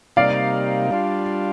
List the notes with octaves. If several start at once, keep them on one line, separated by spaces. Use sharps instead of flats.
C3 G3 A#3 D#4 D5 F5
G3 D4 F4